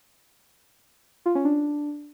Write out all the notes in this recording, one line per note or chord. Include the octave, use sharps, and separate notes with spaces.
F4
C#4
D4